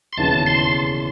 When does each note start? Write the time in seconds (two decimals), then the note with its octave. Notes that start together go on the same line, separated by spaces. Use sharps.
0.13 C6
0.17 E1 D#2 C#3 E3 A5
0.46 C6